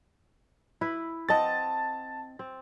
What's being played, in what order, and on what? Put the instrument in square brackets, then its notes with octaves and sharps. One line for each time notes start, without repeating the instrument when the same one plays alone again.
[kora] E4 B4
[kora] C4 D#5 F#5 [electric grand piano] A5 A6
[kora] C4